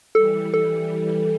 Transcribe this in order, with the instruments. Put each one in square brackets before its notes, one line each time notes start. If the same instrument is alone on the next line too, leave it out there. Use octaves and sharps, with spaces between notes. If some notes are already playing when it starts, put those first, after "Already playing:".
[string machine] E3 G3 [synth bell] A4
[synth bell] A4